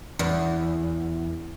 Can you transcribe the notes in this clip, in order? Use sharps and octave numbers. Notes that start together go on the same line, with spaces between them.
E2